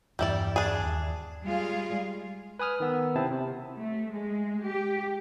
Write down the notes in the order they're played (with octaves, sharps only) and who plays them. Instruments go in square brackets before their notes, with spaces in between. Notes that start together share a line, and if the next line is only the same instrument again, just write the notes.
[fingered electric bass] E2 G2 E3 [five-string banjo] G3 E4 D5
[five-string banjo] D4 G#4
[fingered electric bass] D#2
[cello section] G3 G#3 F4 G#4 F5
[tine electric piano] B4 G#5 D#6 F6
D#3 B3 E6
C3 C4 E4 A5
C3
[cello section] A3
G#3
G4